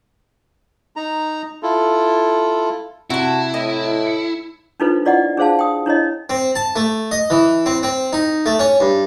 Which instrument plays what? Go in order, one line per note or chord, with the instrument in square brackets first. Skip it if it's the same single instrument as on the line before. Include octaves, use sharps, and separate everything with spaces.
[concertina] D#4 A#5
E4 F4 A4
[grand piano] C3 [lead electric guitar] E4 [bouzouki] F#4 A5
[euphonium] A2 [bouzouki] D#5
[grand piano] C#7
[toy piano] D4 D#4 F4 A4 B4 C5
E4 F4 D5 D#5 F#5
D4 G#4 C5 F5 A5
G5 D#6
D4 E4 C#5 D#5
[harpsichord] C4
A5
A3
D#5
E3
C4
C4
D#4
A3
C#4
G2